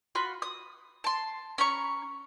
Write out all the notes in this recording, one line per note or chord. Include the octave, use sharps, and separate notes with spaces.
F4 F#4 B5 C6
D#6
A5 C6
C#4 A#5 B5 C#6